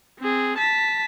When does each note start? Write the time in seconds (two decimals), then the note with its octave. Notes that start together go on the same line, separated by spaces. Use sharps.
0.20 C4 G#4
0.58 A5 B6